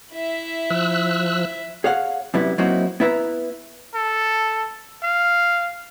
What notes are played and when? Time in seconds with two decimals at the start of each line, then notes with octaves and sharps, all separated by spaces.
0.13 E4 E5
0.70 F3 E6 F#6
1.84 G#4 C#5 F5 F#5
2.34 F#2 C3 G3 B3 E4
2.58 F#3 A#3 C4 D#4 E4 F#4
3.00 B3 E4 B4 E5 A#5
3.94 A4
5.03 F5